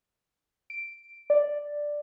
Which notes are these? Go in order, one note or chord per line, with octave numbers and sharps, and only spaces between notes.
D7
D5